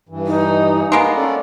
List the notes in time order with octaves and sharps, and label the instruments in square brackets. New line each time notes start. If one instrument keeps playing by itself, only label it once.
[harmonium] G2 E3
[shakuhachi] D#4
[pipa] G#3 A#3 B3
[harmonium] C#4 A4 D5